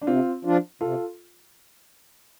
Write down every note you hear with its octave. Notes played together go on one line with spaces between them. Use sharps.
D4
C3 C4 F4
F3 D4 F4
C3 F4 A4